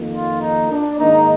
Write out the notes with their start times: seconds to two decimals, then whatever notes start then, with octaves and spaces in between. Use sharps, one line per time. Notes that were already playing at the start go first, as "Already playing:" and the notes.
Already playing: F2 D#3 A#3
0.13 F4
0.41 D#4
0.70 D4
0.99 G#2 D#3 A#3 D#4